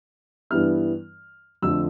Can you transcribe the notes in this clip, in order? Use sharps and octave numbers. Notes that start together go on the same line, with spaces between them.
G2 E3 G3 B3 E4 F6
F2 D3 F3 A3 E6